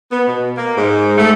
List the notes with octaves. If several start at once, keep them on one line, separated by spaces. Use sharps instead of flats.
B3
B2
A#3
G#2
A3